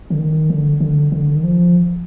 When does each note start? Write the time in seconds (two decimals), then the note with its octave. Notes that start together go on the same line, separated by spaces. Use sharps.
0.10 D3
0.18 D#3
0.50 D3
0.80 D3
1.12 D3
1.36 D#3
1.43 F3